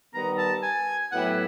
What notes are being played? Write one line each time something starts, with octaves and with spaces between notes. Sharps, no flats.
D#3 G3 B3 A#5
A5
G#5
A2 F#3 B3 E4 G4 F#5